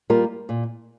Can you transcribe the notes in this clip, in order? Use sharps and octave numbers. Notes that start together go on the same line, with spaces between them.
G3 A#3 F4 A#4
A#2